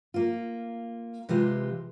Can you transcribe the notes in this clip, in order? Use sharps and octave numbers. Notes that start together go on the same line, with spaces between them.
A#3 F4
C3 E3 G#3 F4 G4